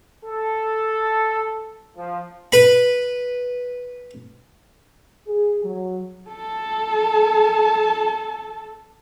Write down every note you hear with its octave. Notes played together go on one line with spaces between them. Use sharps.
A4
F3
B4 B5
G#4
F#3
A4 A5